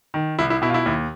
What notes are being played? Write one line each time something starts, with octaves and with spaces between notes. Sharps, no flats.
D#3
C2 E4
E4
B2 E4
F4
E4
D#2